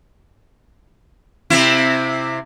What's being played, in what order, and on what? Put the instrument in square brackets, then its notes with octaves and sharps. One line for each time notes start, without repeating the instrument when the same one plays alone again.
[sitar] C3 C4 E4